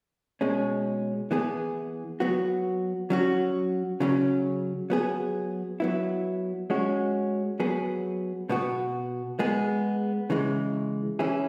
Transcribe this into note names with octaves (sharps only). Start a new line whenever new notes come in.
B2 G#3 C#4
E3 B3 G#4
F#3 B3 F#4
F#3 C#4 F#4
C#3 F#3 C#4
F#3 B3 G#4
F#3 B3 E4
G#3 C#4 F#4
F#3 B3 G#4
B2 B3 F#4
G#3 B3 G#4
C#3 E3 G#3
E3 C#4 E4 G#4